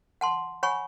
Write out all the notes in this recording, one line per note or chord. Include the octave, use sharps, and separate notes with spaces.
F#5 A5 C6
C#5 F#5 G#5 B5 C#6